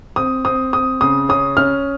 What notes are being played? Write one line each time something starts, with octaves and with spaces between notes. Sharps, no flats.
C4 D#6
C4 D#6
C4 D#6
C#3 D#6
C#4 D#6
C#4 F6